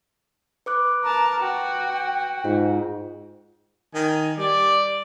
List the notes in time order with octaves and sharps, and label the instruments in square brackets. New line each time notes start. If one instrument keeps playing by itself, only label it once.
[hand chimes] B4 D6 F#6
[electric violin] A#4 A5 [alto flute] A#5
[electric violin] F#4 [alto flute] G5
[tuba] G#2 [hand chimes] F4
[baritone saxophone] D#3 [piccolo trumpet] G#5
[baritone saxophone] G3 [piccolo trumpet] D5